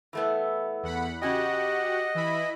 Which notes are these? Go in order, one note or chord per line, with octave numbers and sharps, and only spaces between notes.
E3 A3 B3
E2 F#5 B5
C#3 C#4 F#4 G4 D#5 F#5 G5
E3 E4 B5